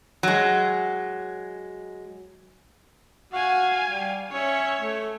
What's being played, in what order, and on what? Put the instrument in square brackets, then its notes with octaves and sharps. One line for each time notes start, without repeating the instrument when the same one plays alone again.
[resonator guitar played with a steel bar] F#3 G#3
[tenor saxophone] F#4 [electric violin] F5 G#5
[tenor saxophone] G3
[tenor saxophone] C#4 [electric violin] C#5 E5
[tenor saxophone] A3